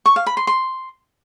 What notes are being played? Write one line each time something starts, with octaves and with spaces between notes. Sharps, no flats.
C#6
F5
B5
C6
C6